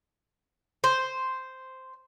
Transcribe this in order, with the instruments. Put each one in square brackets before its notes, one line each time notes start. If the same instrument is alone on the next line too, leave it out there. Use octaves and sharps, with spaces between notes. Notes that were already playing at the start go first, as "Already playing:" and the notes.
[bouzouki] C5